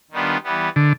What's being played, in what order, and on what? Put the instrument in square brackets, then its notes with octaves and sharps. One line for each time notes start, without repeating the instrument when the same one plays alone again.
[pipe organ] D#3 G3 B3 D4 F4
E3 G3 B3
[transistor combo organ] D3